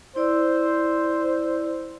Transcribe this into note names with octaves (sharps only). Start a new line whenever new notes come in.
E4 C5 D5 E6